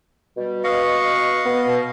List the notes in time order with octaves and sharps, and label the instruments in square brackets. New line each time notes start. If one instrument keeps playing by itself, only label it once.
[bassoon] B2 [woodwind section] G3
[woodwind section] B4 C#6 [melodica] D#5 F5
[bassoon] B3
[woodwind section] B2